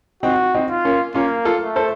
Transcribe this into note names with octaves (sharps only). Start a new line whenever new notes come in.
C4 D#4 F#4
C4 D#4
F4
A#3 C#4
A#3 C#4 F4
F4 A4
A3
A4 C5